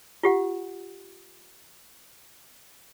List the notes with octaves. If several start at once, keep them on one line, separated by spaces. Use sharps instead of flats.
F4 G4 F#5